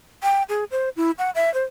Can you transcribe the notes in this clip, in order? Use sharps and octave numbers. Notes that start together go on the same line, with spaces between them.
G5
G#4
C5
E4
F#5
E5
C5